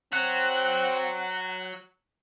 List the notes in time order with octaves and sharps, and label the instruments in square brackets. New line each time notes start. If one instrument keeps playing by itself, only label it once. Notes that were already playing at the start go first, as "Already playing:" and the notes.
[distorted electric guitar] F#3 [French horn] C4 [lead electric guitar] F#5